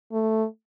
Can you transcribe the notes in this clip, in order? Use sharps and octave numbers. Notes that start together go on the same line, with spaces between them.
A3